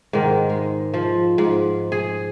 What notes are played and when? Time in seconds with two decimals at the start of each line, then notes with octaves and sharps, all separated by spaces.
0.13 G#2 D#3
0.49 G#3
0.94 F3
1.38 G#2
1.92 G#4